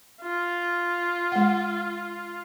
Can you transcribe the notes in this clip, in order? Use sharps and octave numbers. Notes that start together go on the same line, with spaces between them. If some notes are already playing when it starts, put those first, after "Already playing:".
F4
G#3 F#5